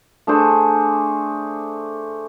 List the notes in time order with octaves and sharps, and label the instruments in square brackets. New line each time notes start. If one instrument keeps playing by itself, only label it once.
[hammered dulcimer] A3 D4 G#4 C5